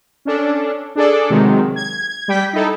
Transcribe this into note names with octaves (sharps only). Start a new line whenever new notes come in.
C#4 D4 A4
D4 G#4 A4 D5
C3 D#3 F#3 G#3
G#6
G3 G5 B6
D#4 E4 A4